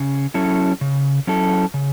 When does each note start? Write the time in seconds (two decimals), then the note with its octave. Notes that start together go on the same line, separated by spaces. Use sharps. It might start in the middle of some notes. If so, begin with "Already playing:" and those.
Already playing: C#3
0.34 F#3 C#4 E4 A4
0.81 C#3
1.27 F#3 C#4 E4 A4
1.74 C#3